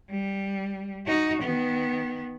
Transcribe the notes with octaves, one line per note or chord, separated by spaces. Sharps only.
G3
D#4 F#4
D#3 B3